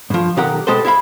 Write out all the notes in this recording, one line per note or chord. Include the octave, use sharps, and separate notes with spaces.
G2 F3
B1 D#3 G4 A#4 F#5 A#5
B2 G#3 G4 A4 B4 C5
E4 E5 F5 B5